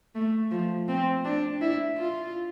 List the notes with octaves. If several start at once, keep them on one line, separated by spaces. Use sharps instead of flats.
A3
F3
C4
D4
E4
F4